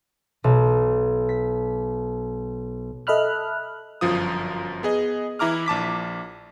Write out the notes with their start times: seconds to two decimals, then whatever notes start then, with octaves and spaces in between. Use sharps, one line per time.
0.44 B1
1.29 B6
3.07 A4 D#5 E5 B5 F6 F#6
4.01 G1 F#2 F3 F4 D#6
4.83 B3 G#4 D#5
5.39 E3 E4 A#5 D6 F6
5.66 A#1 A5 D6 B6